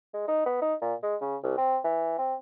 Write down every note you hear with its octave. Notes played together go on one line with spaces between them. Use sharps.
G#3
D#4
B3
D#4
A#2
G#3
C#3
C2
C4
E3
C4